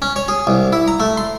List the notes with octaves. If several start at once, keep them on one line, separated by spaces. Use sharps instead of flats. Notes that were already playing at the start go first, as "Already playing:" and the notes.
C#4
C#5
G#4
C2
E4
A#5
A3
C6